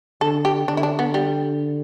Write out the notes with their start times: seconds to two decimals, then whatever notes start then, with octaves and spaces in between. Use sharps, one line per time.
0.21 D3 A4
0.45 G4
0.68 D3 D4
0.77 E4
0.83 D4
0.99 B3
1.14 G3